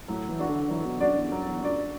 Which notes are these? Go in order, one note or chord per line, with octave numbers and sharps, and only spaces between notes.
A2 F#3
E3
D4 F#4 D5
D3
E3 F#3
B2
F#2 D4 F#4 D5
E2
F#2 F#3
E2
F#2 D4 F#4 D5